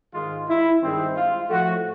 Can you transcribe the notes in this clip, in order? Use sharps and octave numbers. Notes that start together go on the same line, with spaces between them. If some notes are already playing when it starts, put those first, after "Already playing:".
G#2 D#3 G#3 F4
E4
G2 D#3 G#3 C4
F4
A2 F3 A3 F#4